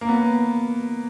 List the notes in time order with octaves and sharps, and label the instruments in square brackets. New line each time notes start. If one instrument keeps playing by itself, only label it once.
[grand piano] A#3
B3